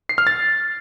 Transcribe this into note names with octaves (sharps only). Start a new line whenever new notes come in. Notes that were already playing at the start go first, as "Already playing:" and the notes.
C7
F6
A6